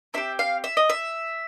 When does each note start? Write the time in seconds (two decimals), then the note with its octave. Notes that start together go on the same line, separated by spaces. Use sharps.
0.14 C4 E4 G4 E5
0.39 F5
0.64 E5
0.77 D#5
0.90 E5